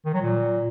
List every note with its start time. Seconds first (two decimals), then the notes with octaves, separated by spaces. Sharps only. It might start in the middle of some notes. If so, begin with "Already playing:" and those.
0.05 D#3
0.14 F#3
0.22 A#2